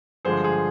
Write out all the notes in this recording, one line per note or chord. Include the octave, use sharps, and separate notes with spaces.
G2 D3 F3 G#3 G#4 C5
G#4